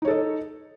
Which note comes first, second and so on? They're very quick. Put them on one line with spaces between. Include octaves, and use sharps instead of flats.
D#4 C#5 A4 D#5